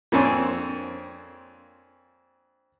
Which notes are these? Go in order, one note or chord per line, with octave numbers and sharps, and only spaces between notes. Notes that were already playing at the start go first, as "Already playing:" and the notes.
F2 A#3 C4 D4 C#5 G#5